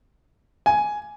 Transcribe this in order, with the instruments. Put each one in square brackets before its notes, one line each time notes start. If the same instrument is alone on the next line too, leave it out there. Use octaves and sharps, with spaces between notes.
[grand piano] G#5